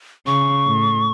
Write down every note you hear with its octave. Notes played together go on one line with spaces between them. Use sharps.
C#3 C#6
A2